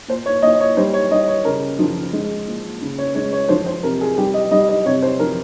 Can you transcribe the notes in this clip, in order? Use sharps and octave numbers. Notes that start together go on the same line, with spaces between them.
A#2 C5
C#5
A#2 D#5
C#5
G3 C5
C#5
G3 D#5
C#5
C#3 A#4
F3
G#3
A#2
C#3
C#5
G#3 C#5
C#5
F3 C5
C5
C3 A#4
G#4
G3 G4
D#5
G3 D#5
D#5
C3 C#5
C5
F3 A#4